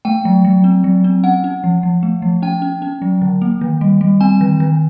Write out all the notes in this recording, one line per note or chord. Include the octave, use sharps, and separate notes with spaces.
A3 G5
F#3
F#3
C4
F#3
C4
C#4 F#5
C#4
F3
F3
A3
F3
C#4 G5
C#4
C#4
F#3
D3
A#3
D#3
G3
G3
C4 G#5
D#3
D#3